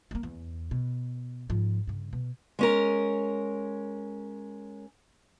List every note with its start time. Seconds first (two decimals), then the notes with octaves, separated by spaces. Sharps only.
0.11 G3 A#3
0.23 E2
0.71 B2
1.50 G#2 F3
1.87 G2 C#3
2.13 B2
2.59 G#3 C#4 A#4